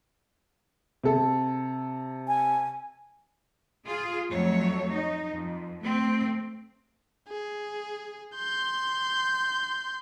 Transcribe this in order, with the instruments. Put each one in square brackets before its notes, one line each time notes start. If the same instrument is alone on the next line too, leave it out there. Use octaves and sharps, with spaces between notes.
[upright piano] C3 A4
[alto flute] G#5
[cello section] F4 G#4
F2 F#3 A3 C#5
D#4
F2
A3 C4
[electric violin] G#4
C6 G6